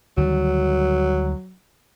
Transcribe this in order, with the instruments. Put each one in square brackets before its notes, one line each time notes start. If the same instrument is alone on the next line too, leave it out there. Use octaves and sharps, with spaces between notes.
[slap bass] D2 D#3 G3 [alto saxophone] F#3